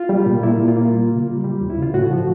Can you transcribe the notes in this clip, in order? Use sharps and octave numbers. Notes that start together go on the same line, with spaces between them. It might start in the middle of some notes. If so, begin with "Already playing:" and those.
Already playing: F4
G3
A#2
A#3 E4
A#2
F4
A#3
G3
C#3
G3
G3
D#2
E4
C#3 F4
A2 F#4
F3